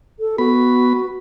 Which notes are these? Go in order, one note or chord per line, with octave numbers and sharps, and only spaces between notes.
A4
B3 F#4 B5